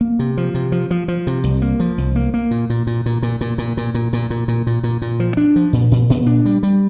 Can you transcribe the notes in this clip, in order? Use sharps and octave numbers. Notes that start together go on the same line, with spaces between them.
A#3
C3
F3
C3
F3
F3
F3
C3
C2
A#3
F3
C2
A#3
A#3
A#2
A#2
A#2
A#2
A#2
A#2
A#2
A#2
A#2
A#2
A#2
A#2
A#2
A#2
A#2
F3
D4
F3
A#2
A#2
A#2
D4
G3
G3